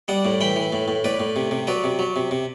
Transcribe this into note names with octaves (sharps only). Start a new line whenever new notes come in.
G3 D5 F#5
A2
E3 G5 B5
E3
A2
A2
A2 B4 D5
A2
C3
C3
F#3 B4 D5
C3
F#3
C3
C3